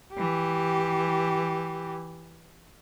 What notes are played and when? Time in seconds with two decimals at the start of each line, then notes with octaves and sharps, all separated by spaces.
0.14 E3 G4